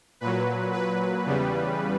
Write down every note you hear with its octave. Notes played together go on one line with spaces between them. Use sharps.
A#2 F#3 B4
B4
E2 C#3 G3